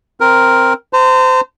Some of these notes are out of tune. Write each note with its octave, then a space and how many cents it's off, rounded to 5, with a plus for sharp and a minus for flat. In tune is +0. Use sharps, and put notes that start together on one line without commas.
C4 +0 A#4 +5
C5 -25 A#5 -45